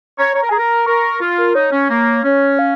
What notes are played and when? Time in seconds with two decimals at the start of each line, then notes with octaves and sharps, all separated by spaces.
0.18 C#5 A#5
0.35 C#5 A#5
0.43 A#4
0.49 G#4 G#5 A#5
0.58 A#4
0.86 A#4 C#6
1.21 F4
1.38 A#4
1.55 D#4 C#5
1.72 C#4
1.90 A#3
2.24 C#4 C#5
2.59 F5